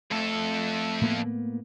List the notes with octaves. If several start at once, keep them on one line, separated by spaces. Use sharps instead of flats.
F2 A3 A4
A2 A#3 B3